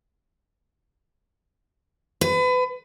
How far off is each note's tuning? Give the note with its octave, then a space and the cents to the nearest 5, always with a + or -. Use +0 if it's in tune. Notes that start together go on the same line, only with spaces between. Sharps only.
B4 +30